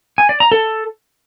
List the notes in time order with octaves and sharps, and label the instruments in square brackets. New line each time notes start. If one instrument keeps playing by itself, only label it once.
[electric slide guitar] G#5
D5
A#5
A4